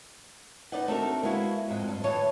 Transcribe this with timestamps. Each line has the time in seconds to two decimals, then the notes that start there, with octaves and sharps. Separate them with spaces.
0.72 D#4 B4 D5 D#5 F#5
0.88 A3 C4 D4 D#4 F#4 A#4
1.23 G#3 A#3 B3 E4 F#4
1.68 F2 G#2 G#3
1.88 G2
2.04 D2 E3 C#5 A5